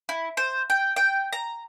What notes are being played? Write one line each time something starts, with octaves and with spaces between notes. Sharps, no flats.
E4
C5
G5
G5
A#5